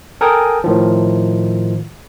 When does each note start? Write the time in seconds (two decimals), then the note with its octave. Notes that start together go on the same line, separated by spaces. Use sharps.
0.21 A4 A#4 G5 G#5 D#6
0.64 A2 D#3 F3